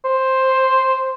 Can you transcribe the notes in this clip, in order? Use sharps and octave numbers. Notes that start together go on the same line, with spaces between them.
C5